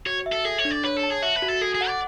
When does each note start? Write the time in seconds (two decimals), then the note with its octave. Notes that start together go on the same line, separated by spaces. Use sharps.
0.06 F#4 C#5
0.26 E5
0.32 A4
0.45 G#4 A4
0.58 C#5
0.65 D4
0.71 D5
0.84 B4 C#5
0.97 A4
1.03 A5
1.10 G#4
1.22 F#4 E5
1.36 B4
1.42 F#4
1.48 A4
1.61 G#4 A4
1.75 G#4
1.81 F#5
1.88 D5